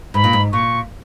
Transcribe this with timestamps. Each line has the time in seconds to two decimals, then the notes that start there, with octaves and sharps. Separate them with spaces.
0.14 G#2 B5
0.24 A#2
0.33 G#2
0.53 A#2 C#6